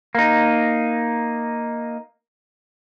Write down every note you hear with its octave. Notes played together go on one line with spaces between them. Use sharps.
A#3 D#4